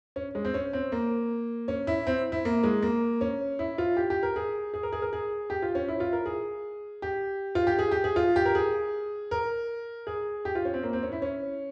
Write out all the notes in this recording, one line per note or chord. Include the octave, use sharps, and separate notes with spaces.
C#4
G#3
C4
C#4
C4
A#3
C#4
E4
C4
E4
A#3
G#3
A#3
C#4
E4
F4
G4
G4
A#4
G#4
G#4
A#4
G#4
A#4
G#4
G4
F4
C#4
E4
F4
A#4
G#4
G4
F4
G4
G#4
G4
G#4
F4
G4
A#4
G#4
A#4
G#4
G4
F4
C#4
C4
A#3
C4
C#4
E4
C#4